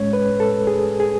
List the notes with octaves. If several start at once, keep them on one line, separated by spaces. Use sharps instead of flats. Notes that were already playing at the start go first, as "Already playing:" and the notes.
Already playing: A2 G#3 C#4 C#5
B4
A4
G#4
G#4